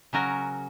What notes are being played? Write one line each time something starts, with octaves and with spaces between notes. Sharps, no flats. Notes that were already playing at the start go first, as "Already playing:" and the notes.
C#3 F#3 C#4 F#4 A#4